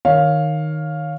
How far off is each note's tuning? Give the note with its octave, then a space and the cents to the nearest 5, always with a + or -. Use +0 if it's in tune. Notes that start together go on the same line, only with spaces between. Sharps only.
D#3 -5 C#5 +5 F5 +5